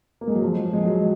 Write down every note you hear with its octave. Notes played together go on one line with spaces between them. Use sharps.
A#3
G#3
F#3
F3
G#3
F#3